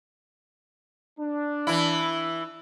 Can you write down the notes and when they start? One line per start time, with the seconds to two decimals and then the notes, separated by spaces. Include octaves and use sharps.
1.19 D4
1.67 E3 E4